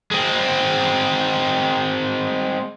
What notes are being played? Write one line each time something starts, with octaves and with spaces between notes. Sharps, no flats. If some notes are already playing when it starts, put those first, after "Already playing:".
G#3 C4